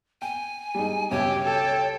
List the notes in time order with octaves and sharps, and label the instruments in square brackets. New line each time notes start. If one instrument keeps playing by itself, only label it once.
[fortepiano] G5 [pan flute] G#5
[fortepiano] G3 G#3 D#4
[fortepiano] C#2 G2 B2 [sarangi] G4 [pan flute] C#5 [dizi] E5
[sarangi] A4 [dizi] G5